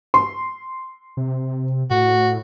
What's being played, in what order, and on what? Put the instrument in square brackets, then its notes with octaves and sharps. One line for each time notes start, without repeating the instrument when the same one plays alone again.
[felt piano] C6
[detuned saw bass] C3
[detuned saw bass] A2 [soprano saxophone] F#4